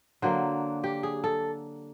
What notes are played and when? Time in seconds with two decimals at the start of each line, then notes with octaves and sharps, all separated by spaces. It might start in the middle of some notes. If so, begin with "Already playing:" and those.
0.22 D3 F#3 A#3 C5
0.84 G4
1.03 G#4
1.24 A4